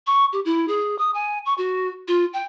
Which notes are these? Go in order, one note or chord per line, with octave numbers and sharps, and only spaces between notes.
C#6
G4
E4
G#4
D#6
G#5
C#6
F#4
F4
G5